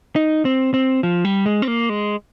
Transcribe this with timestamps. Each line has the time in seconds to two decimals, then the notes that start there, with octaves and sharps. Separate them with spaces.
0.16 D#4
0.45 C4
0.74 C4
1.03 F3
1.25 G3
1.46 G#3
1.62 C4
1.68 A#3
1.89 G#3